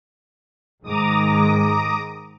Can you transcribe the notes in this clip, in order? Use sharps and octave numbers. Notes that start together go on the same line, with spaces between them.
G#2 D#3 G#3 A#5 D6 D#6